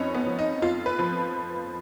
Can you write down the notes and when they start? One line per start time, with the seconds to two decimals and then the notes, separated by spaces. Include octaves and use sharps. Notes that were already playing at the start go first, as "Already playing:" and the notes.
Already playing: F2 F3 C#4 D#4 B4
0.15 B3
0.26 F3
0.39 D#4
0.62 F2 F4
0.86 B4
0.99 F3